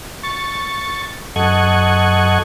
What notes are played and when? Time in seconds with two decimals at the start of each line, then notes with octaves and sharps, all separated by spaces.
0.23 C#6 A6
1.36 F#2 A4 D#5 F#5 C#6 G#6